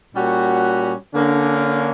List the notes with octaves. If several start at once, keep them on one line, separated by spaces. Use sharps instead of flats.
A#2 G3 C#4 F#4
D3 A#3 C#4